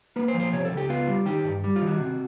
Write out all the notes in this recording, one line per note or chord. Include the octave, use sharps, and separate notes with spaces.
A#3 B4
C5
F3
C5
C3 C#5
A4
C#2
G4
B3 F4
G3
D#3 G4
G2
G3
F4
D#3
F#4
C3